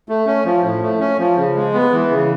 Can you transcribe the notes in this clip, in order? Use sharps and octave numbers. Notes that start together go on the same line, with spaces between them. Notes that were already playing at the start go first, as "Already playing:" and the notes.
A3
C#4
F3
A2
A3
C#4
F3
C#3
G#3
B3
E3
C#3